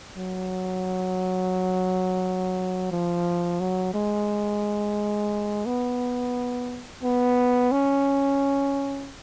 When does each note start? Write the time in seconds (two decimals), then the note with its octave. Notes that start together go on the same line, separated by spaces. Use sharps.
0.17 F#3
2.91 F3
3.60 F#3
3.94 G#3
5.66 B3
7.03 B3
7.72 C#4